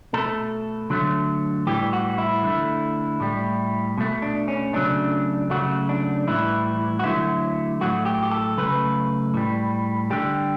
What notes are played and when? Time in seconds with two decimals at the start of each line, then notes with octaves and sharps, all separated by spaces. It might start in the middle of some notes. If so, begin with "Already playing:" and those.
0.13 B2 A3 A4
0.90 D3 F#3 A3
1.67 A2 E3 G3 G4
1.93 F#4
2.18 E4
2.44 D3 A3
3.20 A2 G3
3.98 B2 A3
4.22 D4
4.48 C#4
4.73 C#3 F#3 A3 D4
5.50 C#3 F#3 A3 F#4
5.89 D4
6.27 A2 E3 G3 E4
6.99 F#4
7.04 D3 F#3 A3 E4
7.81 A2 F#3 A3 F#4
8.05 G4
8.23 G4
8.31 A4
8.57 C#3 F#3 A3 B4
9.34 A2 G3
10.10 D3 G3 G4